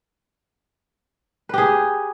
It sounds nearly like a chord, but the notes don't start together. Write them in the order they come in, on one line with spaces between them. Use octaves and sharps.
B4 G4 G#4